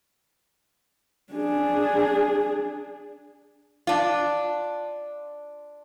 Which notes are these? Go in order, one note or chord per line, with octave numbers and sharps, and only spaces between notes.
D4 G#4
D4 F4